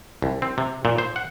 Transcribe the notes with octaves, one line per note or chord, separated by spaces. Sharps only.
C2
C4
C3
A#2
C5
F#5